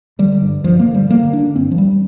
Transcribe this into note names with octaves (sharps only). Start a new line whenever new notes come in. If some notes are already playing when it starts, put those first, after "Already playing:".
D3 G3
G2
G2 F3
A#3
D3
G3
D3 A#3
D3 D4
G2 C4
F3
G2 G3